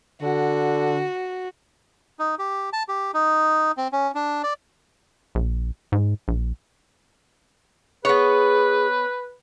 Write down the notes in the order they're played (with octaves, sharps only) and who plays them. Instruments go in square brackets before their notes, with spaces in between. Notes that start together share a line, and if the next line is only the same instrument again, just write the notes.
[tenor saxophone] D3 [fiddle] F#4
[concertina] D#4
G4
A5
G4
D#4
C4
C#4
D4
D5
[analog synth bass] A#1
G#2
A#1
[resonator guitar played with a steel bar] B3 C#5 [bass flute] G#4 [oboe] B4